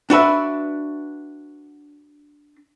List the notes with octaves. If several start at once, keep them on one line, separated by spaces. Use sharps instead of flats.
D4 F#4 B4 E5